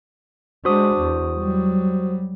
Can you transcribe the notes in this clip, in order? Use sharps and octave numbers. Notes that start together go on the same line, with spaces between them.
G#3 D4 F#4 C5 D#6
E2
F#3 G3